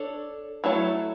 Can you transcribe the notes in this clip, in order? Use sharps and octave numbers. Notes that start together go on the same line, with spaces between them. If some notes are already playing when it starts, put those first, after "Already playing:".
Already playing: D4 A4 C#5
F#3 A3 E4 A4 C#5